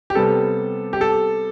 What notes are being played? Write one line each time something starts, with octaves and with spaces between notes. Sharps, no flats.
G4
C3 G3 B3 A4
G4
A4